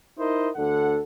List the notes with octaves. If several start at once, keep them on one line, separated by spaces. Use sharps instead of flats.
D#4 E4 A#4 C5 D#5
D2 D3 A4 F#5